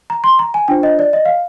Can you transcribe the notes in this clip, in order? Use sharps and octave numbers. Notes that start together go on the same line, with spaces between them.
A#5
C6
A#5
G#5
D4 F4 C5 G5
D#5
D5
D#5
F5